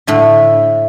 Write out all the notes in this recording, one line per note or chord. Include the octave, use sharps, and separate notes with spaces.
A2 D3 A3